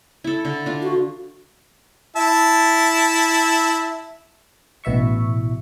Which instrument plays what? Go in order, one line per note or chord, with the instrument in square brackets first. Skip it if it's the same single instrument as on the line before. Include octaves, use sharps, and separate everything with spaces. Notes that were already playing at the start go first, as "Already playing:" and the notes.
[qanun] E4 A4
D3
D4 F4
[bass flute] F#4
[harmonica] E4 E5 A5
[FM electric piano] A1 B2 E4 E5 C#6